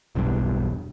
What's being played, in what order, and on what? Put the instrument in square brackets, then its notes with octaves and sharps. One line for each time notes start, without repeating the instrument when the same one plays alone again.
[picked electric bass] E1 B1 E2 G2